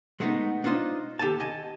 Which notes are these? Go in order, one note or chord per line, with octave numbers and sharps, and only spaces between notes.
G#3 A3 B3 C#4 D#4
D4 D#4 F4 C5 D#5
D#2 G4 A4 G#5 A5
D#5 G#5 A5